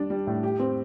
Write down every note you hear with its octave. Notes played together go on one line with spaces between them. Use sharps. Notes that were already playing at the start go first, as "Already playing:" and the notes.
Already playing: G3 D4
G3
A2
G4
C4